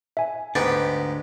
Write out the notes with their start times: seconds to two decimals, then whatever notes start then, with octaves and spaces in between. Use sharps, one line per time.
0.17 E5 G#5
0.55 D2 G#2 D3 B3 G4 A6